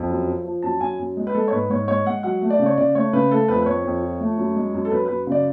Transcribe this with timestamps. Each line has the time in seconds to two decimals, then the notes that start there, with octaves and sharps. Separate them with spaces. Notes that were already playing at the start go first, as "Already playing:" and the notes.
Already playing: F2
0.10 F#2
0.27 F3
0.45 F3
0.63 F#2 A5
0.80 F#2 G#5
0.99 F#2
1.17 G#3
1.27 B4
1.35 G#3 A4
1.48 C#5
1.52 G#2 B4
1.70 G#2 C#5
1.88 G#3 C#5
2.06 G#3 F#5
2.23 F#3 F#5
2.42 A3
2.50 D5
2.59 C#3
2.66 C#5
2.78 C#3 D5
2.95 A3 C#5
3.13 C#3 B4
3.31 A3 A4
3.48 F2 B4
3.62 B4
3.66 F2 C#5
3.85 F2
4.02 F3
4.20 A3
4.38 F#2
4.56 G#3
4.74 F#2
4.85 A4
4.91 F#2 B4
5.05 F#2 B4
5.27 C#3 D5